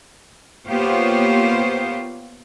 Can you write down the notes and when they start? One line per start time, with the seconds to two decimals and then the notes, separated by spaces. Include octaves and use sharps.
0.67 A#3 B3 F4 G4 C5 C#5